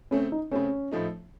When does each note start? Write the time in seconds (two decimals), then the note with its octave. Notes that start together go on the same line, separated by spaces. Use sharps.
0.11 C#3 A3 C4 C#4
0.32 D#4
0.51 C#3 A3 C4 C#4
0.91 A2 F3 A3 D#4